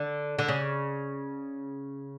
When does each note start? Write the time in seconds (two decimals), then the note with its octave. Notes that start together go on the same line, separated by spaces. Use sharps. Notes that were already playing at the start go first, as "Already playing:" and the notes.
Already playing: D3
0.39 D3
0.48 C#3